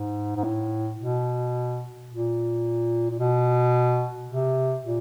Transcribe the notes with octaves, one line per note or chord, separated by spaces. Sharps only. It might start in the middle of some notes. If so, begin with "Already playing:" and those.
Already playing: G#2
G#2
A2
B2
A#2
A#2
B2
C3
A#2